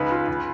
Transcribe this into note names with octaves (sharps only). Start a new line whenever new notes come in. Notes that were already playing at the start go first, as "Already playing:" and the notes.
Already playing: C#2 D#4 B4
F4
C#2